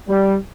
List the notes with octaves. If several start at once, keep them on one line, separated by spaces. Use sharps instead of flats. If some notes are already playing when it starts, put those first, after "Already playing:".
G3